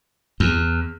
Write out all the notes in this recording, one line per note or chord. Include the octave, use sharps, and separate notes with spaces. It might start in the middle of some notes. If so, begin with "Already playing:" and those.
E2